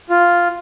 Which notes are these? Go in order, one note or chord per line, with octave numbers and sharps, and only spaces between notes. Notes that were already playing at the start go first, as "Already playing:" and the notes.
F4